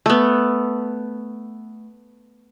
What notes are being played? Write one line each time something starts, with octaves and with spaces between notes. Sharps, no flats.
A3 B3